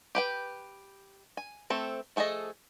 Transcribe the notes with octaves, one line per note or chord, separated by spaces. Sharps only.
G4 B4 G5
G#5
A3 C4 A4
F3 A3 G#4 A4 D#5